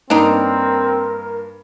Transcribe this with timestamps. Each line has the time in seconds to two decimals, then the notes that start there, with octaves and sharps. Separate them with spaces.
0.10 G2 A#3 C4 D4 D#4 A#4